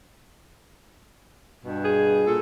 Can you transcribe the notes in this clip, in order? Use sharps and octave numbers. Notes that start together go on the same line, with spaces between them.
G2 B2
G#4
A#2 A4